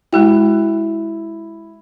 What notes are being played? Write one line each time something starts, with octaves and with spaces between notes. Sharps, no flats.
G#3 E4 F#4 G5